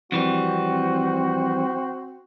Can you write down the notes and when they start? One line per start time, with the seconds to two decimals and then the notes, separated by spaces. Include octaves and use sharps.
0.12 F2 E3 G3 C4 F#4